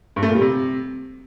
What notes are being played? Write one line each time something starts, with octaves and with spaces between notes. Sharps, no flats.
G2
A3
A#2
G3
C3